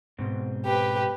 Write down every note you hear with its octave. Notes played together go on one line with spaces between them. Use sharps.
G#2 B2 C4
G4 B4